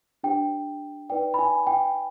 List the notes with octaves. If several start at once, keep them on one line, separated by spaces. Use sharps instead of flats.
D4 G4 C5 G5
D#4 B4 D5 G5
B5
G#5
G5